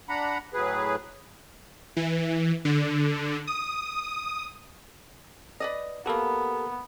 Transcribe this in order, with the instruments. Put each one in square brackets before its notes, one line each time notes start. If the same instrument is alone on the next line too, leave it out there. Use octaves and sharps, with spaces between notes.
[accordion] D4 F#5 A#5 B5
A2 F#3 G#4 B4
[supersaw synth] E3
D3
D#6
[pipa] B4 D5 D#5
[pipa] A#3 F#4 [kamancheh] B3 [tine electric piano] G4 A4 A#4